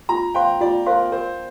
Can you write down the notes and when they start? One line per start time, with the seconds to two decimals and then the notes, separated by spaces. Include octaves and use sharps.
0.09 F4 A#5
0.34 C5 F5 G5 C6
0.61 F4 D5
0.86 A#4 C5 F5 C6
1.12 A#4 C5